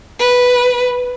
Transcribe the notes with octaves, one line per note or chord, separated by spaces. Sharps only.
B4